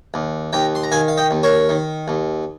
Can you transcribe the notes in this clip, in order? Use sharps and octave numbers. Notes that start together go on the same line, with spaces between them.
D#2
D#2 G5 A#5
C6
A#5
D#3 F5 G#5
F5
D#5 G5
D#2
A#4 C#5
D#3
D#2